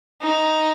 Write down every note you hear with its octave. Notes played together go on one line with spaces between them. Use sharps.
D#4